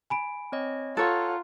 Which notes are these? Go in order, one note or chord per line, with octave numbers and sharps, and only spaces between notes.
G#5 B5 D7
C4 C#5 D#5
F4 A4 C#5 F#5 A#5 F#6